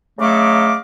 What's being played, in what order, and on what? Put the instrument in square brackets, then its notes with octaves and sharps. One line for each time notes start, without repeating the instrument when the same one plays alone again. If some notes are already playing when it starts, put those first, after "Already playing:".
[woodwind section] C#3 F#3 A3 D#5 F5 D6